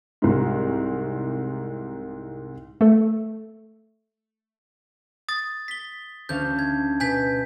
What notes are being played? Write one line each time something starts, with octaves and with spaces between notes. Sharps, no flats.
C2 G#2
A3 A4
D#6 A6
B6 G7
D2 C#4 F5 G6
G#6
B2 G#5 G6 B6